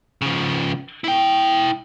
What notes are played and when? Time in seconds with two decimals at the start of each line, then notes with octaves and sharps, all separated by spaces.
0.21 C#3 F3
1.04 E4 G5